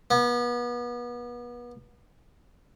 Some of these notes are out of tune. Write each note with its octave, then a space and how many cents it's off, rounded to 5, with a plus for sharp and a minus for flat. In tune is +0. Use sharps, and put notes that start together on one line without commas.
B3 -30